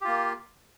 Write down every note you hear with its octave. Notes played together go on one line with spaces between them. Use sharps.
A#3 F4 G4